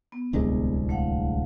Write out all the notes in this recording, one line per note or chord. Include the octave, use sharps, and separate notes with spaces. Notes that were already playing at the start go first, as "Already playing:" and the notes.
B3
D1 C2 G#3
A3 F5 F#5